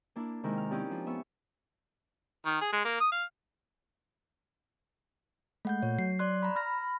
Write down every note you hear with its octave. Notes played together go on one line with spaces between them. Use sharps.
A#3 D4 E4
C3 D#3 G#3 E4 A#4
F6
C4 C#4 D#4 E4 G4 D5
F3
B3 E5 C#6
D#3
G#4
G#3
A#3
D#6
F5
G#3 A3 F#5 G6
A#2 C#5
F#3 C7
D5 C6 F#6
A#5 B5
B5 F6 A#6